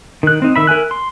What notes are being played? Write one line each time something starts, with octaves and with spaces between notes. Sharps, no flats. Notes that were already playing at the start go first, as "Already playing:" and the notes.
D#3 F#6
C4 D#4
D#3 E5 B5
A#4 E5 G#5 F#6
C6